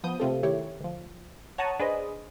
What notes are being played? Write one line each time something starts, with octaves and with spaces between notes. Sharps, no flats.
F3 B3 D#6 G6
C3 A3 C4 F4 G4 A4
D#3 A3 E4 G4 C#5
D2 F3
C#5 F#5 A5 A#5 C#6 D#6
D4 G#4 B4 C5 D#5